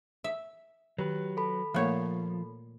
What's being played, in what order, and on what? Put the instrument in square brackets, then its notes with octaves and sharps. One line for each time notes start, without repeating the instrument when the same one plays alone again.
[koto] E5
[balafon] D#3 [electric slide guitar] F#3 B4 [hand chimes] G4
[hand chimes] A4 B5
[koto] A#2 C#5 [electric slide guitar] F3 [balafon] A3 A#3